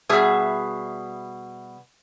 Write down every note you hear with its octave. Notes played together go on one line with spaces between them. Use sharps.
B2 G3 G#4 E5